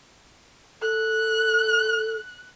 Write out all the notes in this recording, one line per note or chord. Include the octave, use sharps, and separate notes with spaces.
A4 F#6